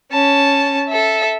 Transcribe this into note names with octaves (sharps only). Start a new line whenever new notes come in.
C#4 A5
A4 E5